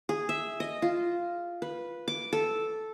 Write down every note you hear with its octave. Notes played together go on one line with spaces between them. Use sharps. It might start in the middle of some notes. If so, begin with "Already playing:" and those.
G#4
E5
D#5
F4
B4
D6
A4